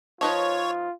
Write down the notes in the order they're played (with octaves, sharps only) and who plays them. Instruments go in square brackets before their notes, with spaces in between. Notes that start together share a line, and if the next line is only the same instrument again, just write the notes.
[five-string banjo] F3 D#4 B4 [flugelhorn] F4 [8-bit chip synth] C#5